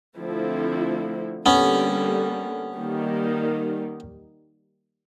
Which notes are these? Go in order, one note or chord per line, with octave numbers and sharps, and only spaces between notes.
D3 F3 A3 C4 E4
D3 G3 A#3 B3 C#4
D#3 G3 A#3 D#4